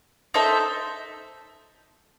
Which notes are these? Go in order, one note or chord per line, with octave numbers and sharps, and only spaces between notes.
D#4 A4 C5 E5